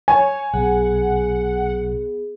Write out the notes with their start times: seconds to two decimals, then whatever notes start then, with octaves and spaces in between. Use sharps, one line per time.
0.08 C#5 G#5
0.54 B1 B3 G#4 F#5